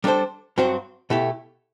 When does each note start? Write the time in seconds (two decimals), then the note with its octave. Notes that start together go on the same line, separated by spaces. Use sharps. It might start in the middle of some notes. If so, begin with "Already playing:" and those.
0.04 G3 D4 A4 C5
0.58 G2 F#3 C4 F#4 C5
1.10 B2 A3 E4 G4